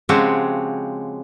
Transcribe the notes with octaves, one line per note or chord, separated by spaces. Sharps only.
C#3 F3 G#3 C4 F#4 G4